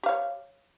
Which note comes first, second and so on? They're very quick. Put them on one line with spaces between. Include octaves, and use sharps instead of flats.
G4 F5 C#5